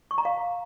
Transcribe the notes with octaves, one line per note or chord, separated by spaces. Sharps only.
C#6
A#5
F5